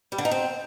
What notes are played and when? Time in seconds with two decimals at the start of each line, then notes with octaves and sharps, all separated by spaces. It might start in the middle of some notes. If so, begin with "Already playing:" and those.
0.12 G3
0.18 D3
0.25 D#4
0.31 C4